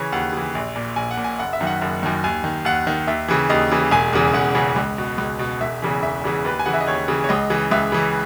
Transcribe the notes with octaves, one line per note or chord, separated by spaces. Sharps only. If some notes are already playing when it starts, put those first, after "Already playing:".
Already playing: C#3 E3 C#5
D#2 F#5
C#3 E3
A#1
A#2
A#1 G#5
F#5
A#2
G#5
F#1 F#5
E5
F#2 D#3
F#5
F#1
F#2 D#3
D#2 G#5
D#3
D#2 F#5
D#3
D#2 E5
C#3 E3
D#2 D#5
C#3 E3
E1 G#5
E2 C#3 E3
E1 F#5
E2 C#3 E3
C#2
B2
C#2
B2
E1 E5
E2 C#3 E3
E1 E5
E2 C#3 E3
D#2 B4
G#5
C#3 E3 F#5
E5
D#5
D#2 C#5
C#3 E3
C#5
C#2 D#5
C#3 E3
C#2 E5
C#3 E3